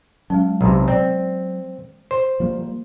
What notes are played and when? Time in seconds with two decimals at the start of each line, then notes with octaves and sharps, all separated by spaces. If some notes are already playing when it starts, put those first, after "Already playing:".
0.30 F#3 G#3 C#4
0.61 B1 C3
0.88 C4 D5
2.11 C5
2.40 F3 G3 A#3